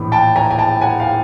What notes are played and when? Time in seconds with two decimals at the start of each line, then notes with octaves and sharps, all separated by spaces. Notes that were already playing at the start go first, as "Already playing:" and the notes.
Already playing: A#1 A2 E3
0.12 G5 A5
0.36 G#5 A#5
0.51 G#5
0.58 G5 A5
0.82 F#5 G#5
1.00 F5 G5